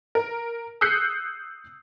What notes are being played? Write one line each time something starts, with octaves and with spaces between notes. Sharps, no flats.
A#4
D#6 E6 F#6 G6 C7 C#7